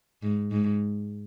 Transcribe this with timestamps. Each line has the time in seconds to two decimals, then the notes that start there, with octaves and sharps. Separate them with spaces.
0.22 G#2
0.52 G#2